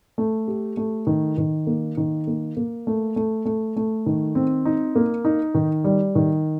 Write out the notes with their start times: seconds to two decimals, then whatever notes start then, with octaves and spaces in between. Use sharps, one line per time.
0.18 A3
0.48 G4
0.77 A3
1.07 D#3
1.38 D#3
1.67 A#3
1.97 D#3
2.27 A#3
2.57 A#3
2.87 A3
3.16 A3
3.45 A3
3.76 A3
4.06 D#3
4.35 C4
4.65 D#4
4.95 A#3
5.25 D#4
5.54 D#3
5.84 G3
6.15 D#3